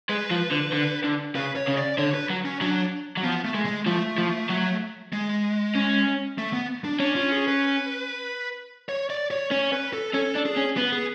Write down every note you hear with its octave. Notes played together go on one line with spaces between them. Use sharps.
G#3 B4
F3
D3
D3
D3
C#3 B4
C#5
C#3
D5
D3 C#5
B4
F#3
C#4
F#3 D4
F#3
F3 B3
A3
G#3
G#3
F3 A3
F3
F#3
G#3
C#4
A3
B3
D4
C#4 D4
F4
G#4
B4
C#5
D5
C#5
C#4 C#5
B4
A4
C#4 A4
D4
G#4
C#4
B3 B4
G#4